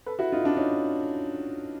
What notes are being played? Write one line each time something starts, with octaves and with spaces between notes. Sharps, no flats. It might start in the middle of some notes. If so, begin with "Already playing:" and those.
A4 B4
E4 F#4
D#4 F4
D4 E4
C#4 D#4